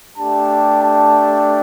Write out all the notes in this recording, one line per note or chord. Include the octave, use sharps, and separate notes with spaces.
A3 D4 G4 A5
A5